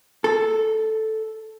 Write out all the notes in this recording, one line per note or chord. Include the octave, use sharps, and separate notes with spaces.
A4